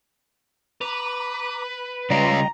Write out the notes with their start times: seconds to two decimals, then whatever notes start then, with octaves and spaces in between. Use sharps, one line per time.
0.81 B4 A#5 D6
2.10 C#3 G3 C#4 F4 D#5 G5 A#5